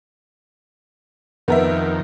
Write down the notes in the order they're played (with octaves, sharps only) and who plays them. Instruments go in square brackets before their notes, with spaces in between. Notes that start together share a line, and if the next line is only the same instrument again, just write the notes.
[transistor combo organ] F2 D#3 [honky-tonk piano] B3 A#4 E5